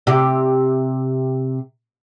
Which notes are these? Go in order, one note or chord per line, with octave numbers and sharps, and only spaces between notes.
C3 G4